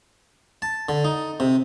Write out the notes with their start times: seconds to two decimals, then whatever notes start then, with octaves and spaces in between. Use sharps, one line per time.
0.62 A5
0.89 D3
1.04 D#4
1.40 C3